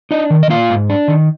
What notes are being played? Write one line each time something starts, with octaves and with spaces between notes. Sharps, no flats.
D4 D#4 D#5
D#3
D#5
A#3 F4 F5
G#2
D4
D#3